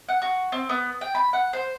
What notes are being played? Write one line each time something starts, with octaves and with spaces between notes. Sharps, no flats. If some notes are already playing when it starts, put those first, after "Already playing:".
F#5
F#4
C4
B3
G5
B5
F#5
C5